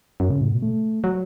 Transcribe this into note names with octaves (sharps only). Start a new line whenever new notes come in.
F#2
C#3
A2
B2
A3
F#3